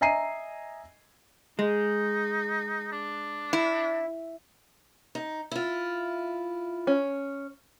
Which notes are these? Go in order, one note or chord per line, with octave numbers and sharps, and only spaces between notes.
D#5 E5 G#5 A#5 C7 D#7
G#3 D#4
D4
E4
D#4
E4 F4
C#4